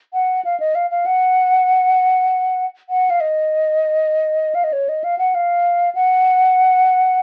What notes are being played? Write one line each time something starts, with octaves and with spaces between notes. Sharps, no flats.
F#5
F5
D#5
F5
F5
F#5
F#5
F5
D#5
F5
D#5
C#5
D#5
F5
F#5
F5
F#5